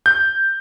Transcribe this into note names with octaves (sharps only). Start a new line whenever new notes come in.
G6